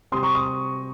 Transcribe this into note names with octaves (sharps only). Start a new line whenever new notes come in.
C3 G3 C4 C6 D#6
A#5 C#6
C6 D#6